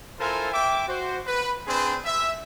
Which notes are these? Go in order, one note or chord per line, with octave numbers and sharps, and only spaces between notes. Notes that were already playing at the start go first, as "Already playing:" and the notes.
E4 F4 A4 A#4 C5 G#5
E5 G5 D6
F#4 C5
B4
C4 D4 G#4 B4 C5
E5